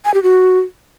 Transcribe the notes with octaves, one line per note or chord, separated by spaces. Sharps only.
G#5
G4
F#4